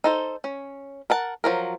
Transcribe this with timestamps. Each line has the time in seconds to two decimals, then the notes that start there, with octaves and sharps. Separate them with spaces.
0.04 D#4 A4 C5
0.44 C#4
1.10 A#4 F#5 A5
1.44 F3 F#3 A#4